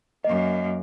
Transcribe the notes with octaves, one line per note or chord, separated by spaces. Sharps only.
F#2 A#3 D#5